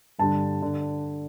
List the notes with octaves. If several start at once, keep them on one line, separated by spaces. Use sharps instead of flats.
G2 D3 G3 A5
D3